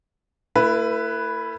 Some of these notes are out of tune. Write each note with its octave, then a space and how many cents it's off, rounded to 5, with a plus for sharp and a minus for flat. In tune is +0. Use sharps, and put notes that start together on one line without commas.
A3 +45 E4 +20 B4 +0